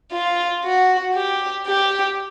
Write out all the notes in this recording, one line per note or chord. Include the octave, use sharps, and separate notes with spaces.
F4
F#4
G4
G4